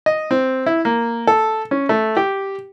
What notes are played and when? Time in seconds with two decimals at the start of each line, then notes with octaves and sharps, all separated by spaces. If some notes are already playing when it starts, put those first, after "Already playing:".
0.06 D#5
0.31 C4
0.66 E4
0.85 A#3
1.27 A4
1.71 C#4
1.89 A3
2.17 G4